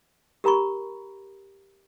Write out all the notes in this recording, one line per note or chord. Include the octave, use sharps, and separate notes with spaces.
G4 A#4 A#5 B5 C#6